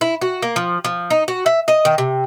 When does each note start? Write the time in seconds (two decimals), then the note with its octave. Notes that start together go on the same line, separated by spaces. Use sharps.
0.01 E4
0.21 F#4
0.42 A#3
0.56 F3
0.85 F3
1.10 D#4
1.28 F#4
1.46 E5
1.68 D#5
1.85 D#3
1.98 C3